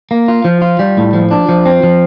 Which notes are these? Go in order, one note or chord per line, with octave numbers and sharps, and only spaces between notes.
A#3
F4
F3
F4
G3
A2
F3
D4
F3
C4
F3